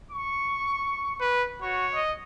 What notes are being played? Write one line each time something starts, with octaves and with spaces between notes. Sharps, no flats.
C#6
B4
F#4 C#5
D#5